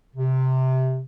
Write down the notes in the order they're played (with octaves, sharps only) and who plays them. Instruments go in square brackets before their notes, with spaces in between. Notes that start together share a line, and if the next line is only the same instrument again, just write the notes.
[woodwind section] C3